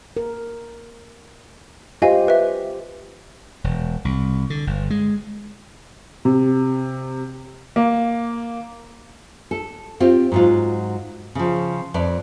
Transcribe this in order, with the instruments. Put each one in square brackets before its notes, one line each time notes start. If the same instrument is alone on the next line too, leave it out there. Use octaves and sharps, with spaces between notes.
[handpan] A#4
[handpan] F4 G4 C5 [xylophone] D#5 F5 G#5
[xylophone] B4 E5
[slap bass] E1
C2
D3
G1
G#3
[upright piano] C3
A#3
[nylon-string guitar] A4
C4 F4 G4
G#2 F#3 F4
C#3 F3
F2 B4 D5